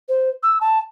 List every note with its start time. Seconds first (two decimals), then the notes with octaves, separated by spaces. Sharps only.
0.09 C5
0.43 E6
0.61 A5